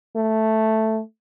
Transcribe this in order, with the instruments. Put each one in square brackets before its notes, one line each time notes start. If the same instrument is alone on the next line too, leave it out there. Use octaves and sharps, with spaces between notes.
[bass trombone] A3